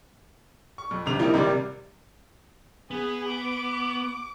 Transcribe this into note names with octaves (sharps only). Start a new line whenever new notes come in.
C#6
F2
B1 G2 C3 F7
E3 F3 G3 A#3 D#4 E4
G#1 C3 D#3 G3 D5
B3 G#4
D6